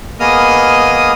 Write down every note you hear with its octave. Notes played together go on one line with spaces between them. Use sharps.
A#3 B3 G#4 D#5 D#6 F6